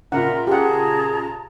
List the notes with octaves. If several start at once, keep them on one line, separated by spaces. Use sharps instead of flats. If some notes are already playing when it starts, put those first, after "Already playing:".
A#2 C#3 A#4 E5 F#5 A#5
G4 G#4 F#5 A5 A#5